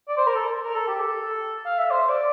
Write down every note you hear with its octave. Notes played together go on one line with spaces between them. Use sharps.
D5
C5
A#4
A4
A#4
A4
G4
A4
F5
E5
C5
D5